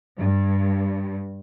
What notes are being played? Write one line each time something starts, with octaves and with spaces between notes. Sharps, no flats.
G2